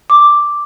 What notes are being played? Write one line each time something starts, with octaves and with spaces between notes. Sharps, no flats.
D6